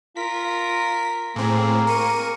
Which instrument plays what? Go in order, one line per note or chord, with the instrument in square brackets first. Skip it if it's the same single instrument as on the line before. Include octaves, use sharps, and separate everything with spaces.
[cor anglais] F4 [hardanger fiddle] A#4 [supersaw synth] B6
[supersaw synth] A2 C4 [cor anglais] A#3 [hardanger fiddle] G#4
[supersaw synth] A#4 D#7 [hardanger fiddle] C#6